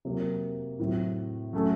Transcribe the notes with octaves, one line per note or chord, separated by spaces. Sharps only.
C3 F#3 A#3
A2 F#3 C4
F#3 A3 C#4 A4